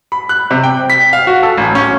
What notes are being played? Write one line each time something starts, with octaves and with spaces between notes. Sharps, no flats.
B5
F#6
C3
G5
B6
F5
F#4
A4
A1
C#4